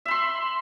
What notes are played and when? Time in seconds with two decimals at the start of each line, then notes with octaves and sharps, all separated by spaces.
0.06 E5
0.08 B5
0.11 C6